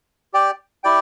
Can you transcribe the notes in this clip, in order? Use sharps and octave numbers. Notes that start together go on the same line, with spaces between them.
G4 D5 G5
E4 G4 D5 G5